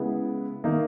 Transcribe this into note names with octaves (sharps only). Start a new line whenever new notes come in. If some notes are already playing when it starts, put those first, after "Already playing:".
Already playing: C#3 G#3 B3 E4
D#3 A#3 D#4